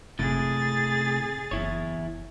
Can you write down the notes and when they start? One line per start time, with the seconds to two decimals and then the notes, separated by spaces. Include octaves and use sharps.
0.19 F#1 A2 C3 G#4 A6
1.51 F#1 E2 E4 C#5